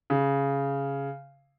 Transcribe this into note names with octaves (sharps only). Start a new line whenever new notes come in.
C#3